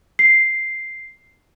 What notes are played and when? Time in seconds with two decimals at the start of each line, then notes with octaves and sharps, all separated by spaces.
0.19 C7